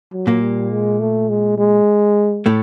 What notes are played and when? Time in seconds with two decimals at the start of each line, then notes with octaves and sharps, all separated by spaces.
0.12 F#3
0.27 A#2 A#3
0.42 G3
0.71 G#3
1.00 A3
1.29 G#3
1.58 G#3
2.46 A2 A3